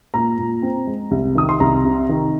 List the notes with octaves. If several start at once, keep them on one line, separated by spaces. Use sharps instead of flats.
A#2 A#5
A#2
C4
G#3
C2
D#3 D#6
C6
C2 A#5
C3
D#3